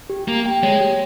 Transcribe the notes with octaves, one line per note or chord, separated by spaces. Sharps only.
G4
A#3 G4
G5
G#3 C#5
G4